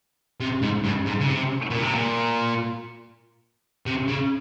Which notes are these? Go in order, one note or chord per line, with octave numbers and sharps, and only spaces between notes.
C3
G#2
G2
G#2
C#3
C3
A#2
C3
A#2
C3
C#3